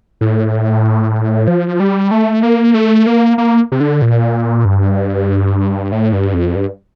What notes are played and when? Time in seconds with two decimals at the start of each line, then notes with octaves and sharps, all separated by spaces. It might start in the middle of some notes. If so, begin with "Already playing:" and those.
0.21 A2
1.48 F3
1.80 G3
2.11 A3
2.43 A#3
2.74 A3
3.06 A#3
3.38 A#3
3.72 C3
3.80 D3
4.02 A#2
4.65 G2
5.92 A2
6.13 G2
6.34 F2
6.56 G2